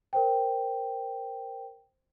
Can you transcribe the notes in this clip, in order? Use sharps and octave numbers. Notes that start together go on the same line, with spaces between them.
A#4 C5 G5